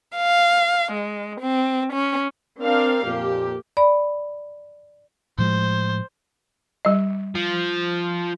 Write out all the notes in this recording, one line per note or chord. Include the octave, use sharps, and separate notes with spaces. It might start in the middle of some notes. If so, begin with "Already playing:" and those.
F5
G#3
C4
C#4
C4 D4 A#4 F5
F2 A#2 A#3 G4
D5 B5
A2 F3 G#3 C5
G3 D#5
F3